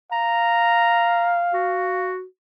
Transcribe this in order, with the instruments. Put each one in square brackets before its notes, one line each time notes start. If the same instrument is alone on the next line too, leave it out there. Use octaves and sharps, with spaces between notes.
[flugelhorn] F5 [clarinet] A#5
[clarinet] F#4